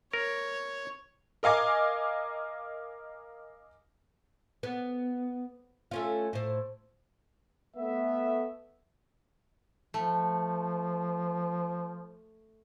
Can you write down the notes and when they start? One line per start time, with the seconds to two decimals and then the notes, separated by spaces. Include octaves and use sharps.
0.13 A#4 C#5
1.43 A#4 D#5 F5 G#5 D6
4.63 B3
5.91 A3 C#4 F4
6.33 A2 C5
7.77 A3 B3 E5
9.94 F3 A3